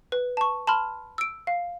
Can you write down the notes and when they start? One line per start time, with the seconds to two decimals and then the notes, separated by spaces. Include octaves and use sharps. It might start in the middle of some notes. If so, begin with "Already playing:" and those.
0.12 B4
0.37 A5 C#6
0.67 A5 B5 C6 F6
1.18 E6 D7
1.47 F5